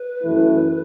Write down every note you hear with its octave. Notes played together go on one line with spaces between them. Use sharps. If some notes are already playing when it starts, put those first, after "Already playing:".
Already playing: B4
F#2 E3 A3 E4